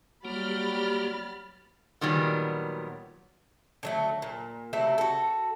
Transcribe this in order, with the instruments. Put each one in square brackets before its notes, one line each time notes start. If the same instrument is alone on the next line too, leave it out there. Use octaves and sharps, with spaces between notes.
[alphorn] F#3 [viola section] G3 [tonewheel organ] A#3 G4 [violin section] B5 F6 A6
[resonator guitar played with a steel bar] A#2 D#3 F#3 G3 B3
[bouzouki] D3 F#3 A3
A#2
C3 F#3 A3 E4
F#4 A4